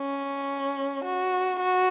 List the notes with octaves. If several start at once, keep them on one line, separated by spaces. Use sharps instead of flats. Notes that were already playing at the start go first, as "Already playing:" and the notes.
Already playing: C#4
F#4
F#4